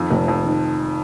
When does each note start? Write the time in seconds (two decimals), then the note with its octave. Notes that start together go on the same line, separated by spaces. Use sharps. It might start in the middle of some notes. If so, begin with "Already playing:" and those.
Already playing: F2 D#3
0.11 F1
0.28 F2
0.45 D#3